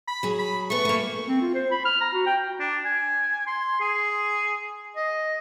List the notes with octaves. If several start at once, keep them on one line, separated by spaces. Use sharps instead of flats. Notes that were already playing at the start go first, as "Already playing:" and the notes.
B5
F#3 G#4
B5
A3 B3 C#6
A3 A#3
C4
F4
C5
B5
F6
A#5
F#4
G5
D4
G#5
C6
G#4
D#5